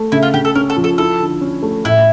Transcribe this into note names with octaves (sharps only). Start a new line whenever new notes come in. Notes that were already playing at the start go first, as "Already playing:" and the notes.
Already playing: A3
C#3 E4
F4
C#3 G4
A4
C#4 A#4
A4
F3
A4
E4 A4
D3
C#4
A3
A2 E4